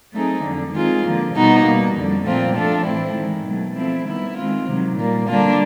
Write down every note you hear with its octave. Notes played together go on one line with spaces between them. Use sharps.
F#3 A3 C4 D#4 G#4
F2 D3 F#3
D#3 G#3 C4 F4 G#4
D3 F3 A#3
B2 G3 B3 D#4 F#4
B2 G3 A#3
F2 D3 G3
A#2 F3 A3 C4 F4
F3 A3 D4 F4 A4
A2 E3 A3 C4 E4
G#2 D#3 G#3
B2 F#3 A3
F3 A3 C4 E4
D#3 G3 B3 E4
D#3 G#3 C4 F4
C3 D#3 F#3
A#2 G3 A#3
D3 G3 A#3 D4 F4